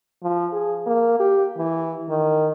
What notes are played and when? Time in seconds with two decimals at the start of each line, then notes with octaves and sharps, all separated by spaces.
0.23 F3
0.52 G#4
0.87 A#3
1.20 G4
1.57 E3
2.09 D#3